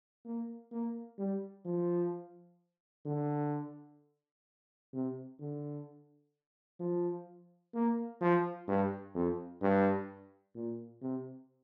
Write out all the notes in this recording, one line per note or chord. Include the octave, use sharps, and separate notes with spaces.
A#3
A#3
G3
F3
D3
C3
D3
F3
A#3
F3
G2
F2
G2
A#2
C3